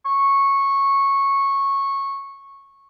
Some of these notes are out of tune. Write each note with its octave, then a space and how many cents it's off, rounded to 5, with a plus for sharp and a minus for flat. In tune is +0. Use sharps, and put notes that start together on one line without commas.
C#6 -10